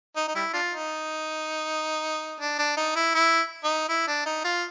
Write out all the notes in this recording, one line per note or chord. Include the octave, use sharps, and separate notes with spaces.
D#4
D#4
G3 E4
D4 F4
D#4
D4
D4
D#4
E4
E4
D#4
E4
D4
D#4
F4